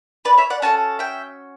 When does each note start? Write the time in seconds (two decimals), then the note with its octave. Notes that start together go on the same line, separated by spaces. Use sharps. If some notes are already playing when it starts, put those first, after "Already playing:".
0.25 B4 D5
0.38 C#5 E5
0.50 D5 F#5
0.62 C#4 F#4 A4 F#5 A5
0.99 E5 G5